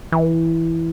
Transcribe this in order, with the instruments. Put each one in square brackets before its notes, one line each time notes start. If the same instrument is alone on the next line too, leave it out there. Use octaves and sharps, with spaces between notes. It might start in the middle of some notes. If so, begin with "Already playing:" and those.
[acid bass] E3